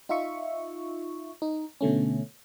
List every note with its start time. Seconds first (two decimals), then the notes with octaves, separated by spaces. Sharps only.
0.09 D#4 F4 E5 C#6
1.42 D#4
1.81 B2 D3 A3 C#4